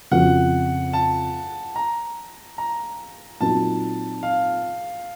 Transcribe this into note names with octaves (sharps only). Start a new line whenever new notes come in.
F2 C#3 F3 C4 F#4 F#5
A5
A#5
A#5
A#2 F#3 C4 D#4 A5
F5